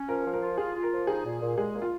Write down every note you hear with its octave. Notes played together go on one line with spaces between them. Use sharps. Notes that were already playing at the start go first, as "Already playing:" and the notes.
Already playing: C#4
F3 A#4
F3
A#4
F4
F4 G#4
F4
A#4
F3
D#4 G#4
A#2
A#2
G#3 G#4
A#2
F4